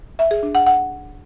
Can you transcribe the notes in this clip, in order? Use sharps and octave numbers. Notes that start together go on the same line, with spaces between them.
E5
G#4
D4
F#5
F#5